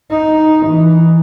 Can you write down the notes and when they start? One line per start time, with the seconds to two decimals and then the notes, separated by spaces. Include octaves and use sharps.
0.10 D#4
0.66 E3